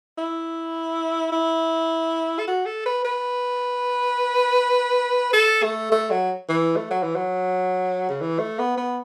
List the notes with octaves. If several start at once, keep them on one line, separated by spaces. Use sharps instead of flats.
E4
E4
A4
F#4
A4
B4
B4
A4
A3
A3
F#3
E3
A3
F#3
E3
F#3
C#3
E3
A3
B3
B3